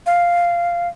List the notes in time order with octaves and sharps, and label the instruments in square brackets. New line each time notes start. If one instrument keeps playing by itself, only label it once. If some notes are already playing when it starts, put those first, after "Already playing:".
[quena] F5